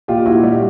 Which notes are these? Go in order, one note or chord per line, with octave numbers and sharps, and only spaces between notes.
A#2 F4 G4
A#2 E4 F#4
G3